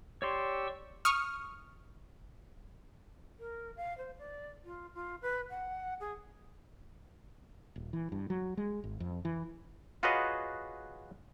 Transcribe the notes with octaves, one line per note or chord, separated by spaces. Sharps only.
G4 C#5 D5 C6 C#6 E6
C#6 D#6 F6
A#4
F5
C5
D5
F4
F4
B4
F#5
G#4
D#1
E3
G2
F#3
G#3
G#1
F2
E3
F4 F#4 G#4 B4 C#5 D#5